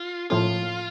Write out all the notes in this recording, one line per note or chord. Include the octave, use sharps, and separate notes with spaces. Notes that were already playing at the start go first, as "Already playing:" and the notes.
Already playing: F4
A2 F3 A#3 C#4 F4 A4